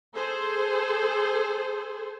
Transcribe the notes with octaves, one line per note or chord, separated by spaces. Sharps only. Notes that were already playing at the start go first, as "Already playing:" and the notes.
G#4 A4 C5